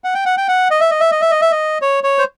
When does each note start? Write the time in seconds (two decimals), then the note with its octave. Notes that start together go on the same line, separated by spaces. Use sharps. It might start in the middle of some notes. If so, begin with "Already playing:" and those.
0.04 F#5
0.14 G5
0.25 F#5
0.38 G5
0.48 F#5
0.71 D#5
0.80 E5
0.91 D#5
1.00 E5
1.11 D#5
1.21 E5
1.31 D#5
1.42 E5
1.52 D#5
1.82 C#5
2.04 C#5
2.18 C5